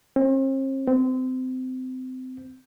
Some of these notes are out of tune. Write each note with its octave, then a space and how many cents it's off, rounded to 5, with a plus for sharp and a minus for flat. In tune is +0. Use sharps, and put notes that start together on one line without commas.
C4 +40
C4 -30